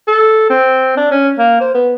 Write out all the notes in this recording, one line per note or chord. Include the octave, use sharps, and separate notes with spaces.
A4
C4
D4
C#4
A#3
C5
B3